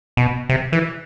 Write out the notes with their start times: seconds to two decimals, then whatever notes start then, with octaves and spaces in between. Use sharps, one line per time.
0.17 B2
0.49 C3
0.72 E3